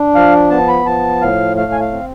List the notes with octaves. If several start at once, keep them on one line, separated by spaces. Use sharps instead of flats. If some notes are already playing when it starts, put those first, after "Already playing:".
Already playing: D4
F3 F5
B3 A5
B5
F3 A5
A2 F5
A3 F5
G#5
F5
C4